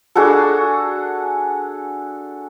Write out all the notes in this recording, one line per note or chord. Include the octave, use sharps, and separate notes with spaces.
D4 F#4 G#4 A4